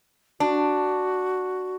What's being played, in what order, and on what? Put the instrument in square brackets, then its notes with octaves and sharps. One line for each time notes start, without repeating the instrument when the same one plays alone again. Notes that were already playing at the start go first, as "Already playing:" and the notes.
[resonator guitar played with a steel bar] D4 [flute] F#4